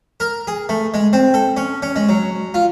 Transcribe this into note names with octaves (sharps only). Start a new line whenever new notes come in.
A#4
G#4
A3
G#3
C4
A4
C#4
C#4
G#3
F#3
F4